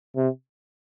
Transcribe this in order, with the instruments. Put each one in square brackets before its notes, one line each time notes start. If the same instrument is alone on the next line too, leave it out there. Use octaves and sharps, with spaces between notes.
[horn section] C3